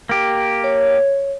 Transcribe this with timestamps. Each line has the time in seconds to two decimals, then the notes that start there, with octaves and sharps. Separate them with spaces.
0.09 A#3 G4
0.64 C#5